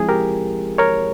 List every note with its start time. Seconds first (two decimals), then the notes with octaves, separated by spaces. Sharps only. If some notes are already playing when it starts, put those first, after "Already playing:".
Already playing: F3 G#3 C4 E4 G#4
0.09 G4 A#4
0.78 A#4 C#5